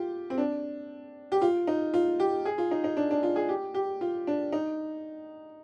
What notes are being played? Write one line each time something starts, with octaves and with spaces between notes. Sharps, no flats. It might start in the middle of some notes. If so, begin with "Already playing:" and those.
Already playing: F4 G4
C4
D4
G4
F4
D#4
F4
G4
G#4
F4
D#4
D#4
D4
D4
F4
G#4
G4
G4
F4
D4
D#4